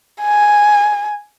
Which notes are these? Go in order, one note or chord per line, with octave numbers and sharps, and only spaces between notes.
G#5